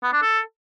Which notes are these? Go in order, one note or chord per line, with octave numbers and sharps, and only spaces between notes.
B3
D4
A4